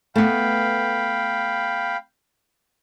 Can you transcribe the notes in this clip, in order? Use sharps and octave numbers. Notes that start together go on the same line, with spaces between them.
A3 B3 F5 G5 B5